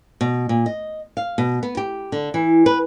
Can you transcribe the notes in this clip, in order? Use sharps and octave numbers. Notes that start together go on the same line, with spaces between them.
B2
A#2
D#5
F5
B2
B3
G4
D3
E3
B4